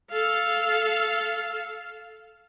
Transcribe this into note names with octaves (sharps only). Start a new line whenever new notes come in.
A4 F5